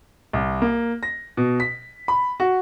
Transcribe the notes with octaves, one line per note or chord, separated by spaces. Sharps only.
C2
A#3
A#6
B2
B6
B5
F#4